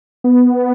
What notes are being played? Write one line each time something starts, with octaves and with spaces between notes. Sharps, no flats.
B3